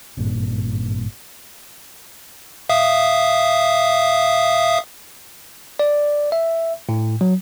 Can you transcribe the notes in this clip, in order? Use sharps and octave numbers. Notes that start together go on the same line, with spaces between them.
G#1 G2 A#2
E5 F5 D#6
D5
E5
A2
F#3